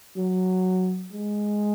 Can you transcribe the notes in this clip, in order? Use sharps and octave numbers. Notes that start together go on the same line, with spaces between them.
F#3
G#3